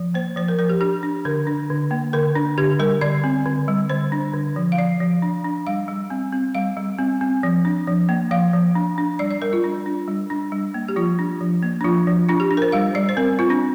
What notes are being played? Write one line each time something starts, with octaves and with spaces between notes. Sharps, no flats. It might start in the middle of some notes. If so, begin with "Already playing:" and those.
Already playing: F3
A#3 C5
F3 C5
A#4
F3 A#4
G4
D4 G4
D4
D3 A#4
D4
D3
A#3
D3 A#4
D4
D3 G4
G3 A#4
D3 D5
C4
D3
G3
D3 C5
D4
D3
F3
F5
F3 D5
F3
D4
D4
G3 F5
G3
C4
C4
G3 F5
G3
C4
C4
F3
D4
F3
A#3
F3 F5
F3
D4
D4
G3 D5
D5
G3 A#4
F4
D4
D4
G3
D4
G3
A#3
G4
F3 F4
D4
F3
A#3
D4
F3 F4
F3
D4 F4
G4
D4
A#4
C5
G3 F5
G3 D5
C5
C4 A#4
C4 F4
D4